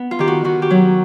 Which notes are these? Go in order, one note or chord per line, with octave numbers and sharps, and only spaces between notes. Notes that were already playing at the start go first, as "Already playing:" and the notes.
Already playing: B3
F4
D#3 G4
F#4
D#3 F#4
G4
F#3